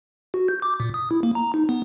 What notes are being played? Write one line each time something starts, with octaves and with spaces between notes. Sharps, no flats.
F#4
G6
D6
A#2
D#6
E4
A#3
A#5
D#4
B3